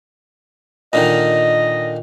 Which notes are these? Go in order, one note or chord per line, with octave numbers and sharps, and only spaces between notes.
A#2 D3 D#3 D#5